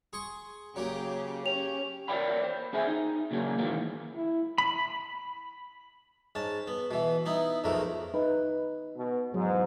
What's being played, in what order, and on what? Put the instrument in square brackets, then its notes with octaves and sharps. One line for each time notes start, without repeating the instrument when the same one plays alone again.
[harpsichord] G#4 C6 C#6
[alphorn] C#3 [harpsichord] F#3 A#3 [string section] G4
[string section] C#4 [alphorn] G4 [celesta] F7
[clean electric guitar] A#4 C#5 D5 G5 B5
C5
C4 G#4 E5 G#5
D#4
A#2 C#3 F#3 A3 A#3 C#4
G#2 D#3 E3 A#3
[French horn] E4
[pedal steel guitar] B5
[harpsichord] G#2 C#4 A5
B3
B2 E3
B3 D#4 E4
B1 F2 G#2 A3 A#4
[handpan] D#4 B4
[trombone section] B2
[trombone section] E2 G#2 [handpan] F#3